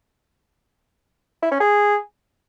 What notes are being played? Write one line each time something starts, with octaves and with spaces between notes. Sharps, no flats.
E4
C#4
G#4